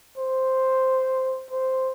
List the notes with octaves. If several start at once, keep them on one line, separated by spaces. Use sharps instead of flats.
C5
C5